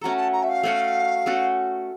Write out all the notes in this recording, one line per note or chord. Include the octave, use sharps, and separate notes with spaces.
A3 C#4 F#4 A4 A#5
A5
A#5
E5
F5
A3 C#4 F#4 A4
A3 C#4 F#4 A4